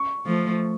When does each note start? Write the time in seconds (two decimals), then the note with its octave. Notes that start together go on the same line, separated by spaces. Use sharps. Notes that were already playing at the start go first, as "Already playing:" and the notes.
Already playing: C#6
0.26 F3 A3